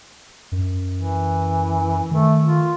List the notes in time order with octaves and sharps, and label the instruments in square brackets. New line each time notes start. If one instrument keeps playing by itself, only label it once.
[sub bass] F#2
[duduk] E3
[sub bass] D#3 [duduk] A3
[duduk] F4